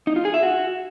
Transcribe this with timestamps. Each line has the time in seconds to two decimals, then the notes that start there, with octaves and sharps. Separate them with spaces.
0.07 D#4
0.16 F4
0.25 G#4
0.34 E5
0.43 F#4